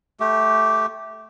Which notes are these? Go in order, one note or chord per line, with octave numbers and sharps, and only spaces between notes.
A3 G4